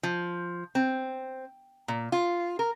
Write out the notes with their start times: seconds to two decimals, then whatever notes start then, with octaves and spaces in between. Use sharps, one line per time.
0.03 F3
0.75 C4
1.88 A#2
2.12 F4
2.59 A#4